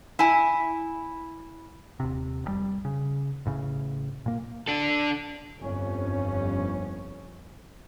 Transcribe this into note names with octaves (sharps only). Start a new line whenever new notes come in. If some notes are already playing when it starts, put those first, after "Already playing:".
E4 G#5
D#1 C3
F1 A#2 G3
C#3
A1 A2 C#3
A#2 A#3
D4 A4
G1 F2 C#4